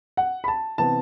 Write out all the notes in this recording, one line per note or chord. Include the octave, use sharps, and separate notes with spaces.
F#5
B5
A5
C3 E3 B3 A5